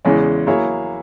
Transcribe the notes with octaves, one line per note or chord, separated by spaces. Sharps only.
E2 C#3 E3 G#3 C#4
F#3 A#3 E4 G#4 C#5